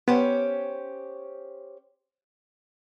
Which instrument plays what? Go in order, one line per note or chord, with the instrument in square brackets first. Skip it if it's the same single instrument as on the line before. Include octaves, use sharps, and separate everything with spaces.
[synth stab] B3 [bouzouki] C#4 G4 C5